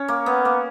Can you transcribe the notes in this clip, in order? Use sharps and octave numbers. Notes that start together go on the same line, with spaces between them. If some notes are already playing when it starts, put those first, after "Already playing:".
Already playing: C#4
A#3
B3
A#3